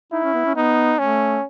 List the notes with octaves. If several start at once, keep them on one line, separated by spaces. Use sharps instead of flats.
D#4 E4
C#4
B3
C#4
B3 D#4
A3 C#4